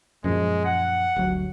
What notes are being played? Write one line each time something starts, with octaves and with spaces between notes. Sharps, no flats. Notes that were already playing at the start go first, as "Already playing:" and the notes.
F#2 A#2 F3 G#3
F#5
G1 D2 F#3